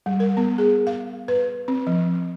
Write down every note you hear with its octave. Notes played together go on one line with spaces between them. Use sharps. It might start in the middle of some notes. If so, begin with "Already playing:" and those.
G3
A#4
B3
G#4
F5
B4
C4
F3